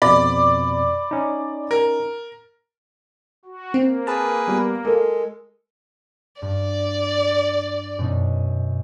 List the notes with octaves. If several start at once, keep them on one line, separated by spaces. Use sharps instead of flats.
F2 B2 D5 B5
C#4 D#4
A#4
F#4
A#3 C4
G#4 B4 A5
G3 B3
G#3 A4 A#4
G2 D5
F#2 B2 D#4